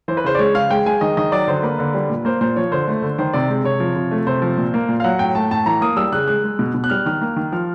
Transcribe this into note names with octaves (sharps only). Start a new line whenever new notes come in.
E3 C5
B4
C#3 C5
D5
G#3 C#5
C#3 F5
G#3 G5
G#3 G#5
D#3 D#5
D#3 D#5
F#3 D5
D3 C5
A#3 B4
D3
G3
A#2
A#3 C5
A#2 C5
F3 C#5
D3 C5
A3
D3
D#3 C5
C3 D5
G#3
C3 C#5
F3
C3
A3
C3 C5
F3
A#2
A#3
A#2
F5
F#3 F#5
A2 G5
A3 A5
A2 A5
E3 A#5
A#3 D#6
G3 E6
C#3 F#6
G#3 F#6
G#3
B2
B2
F#6
G3 F6
D#3 F6
A#3
D#3
F3 F6